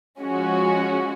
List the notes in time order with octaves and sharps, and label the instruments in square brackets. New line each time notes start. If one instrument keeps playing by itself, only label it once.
[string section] F3 G#3 C#4 F#4